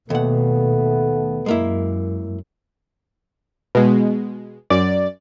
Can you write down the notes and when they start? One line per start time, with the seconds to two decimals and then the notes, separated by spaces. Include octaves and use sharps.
0.10 D#2 B2 A3 B3 A4 F#5
1.46 F#2 G#3 A#3 E4
3.75 B2 G#3
4.70 F#2 D5 A6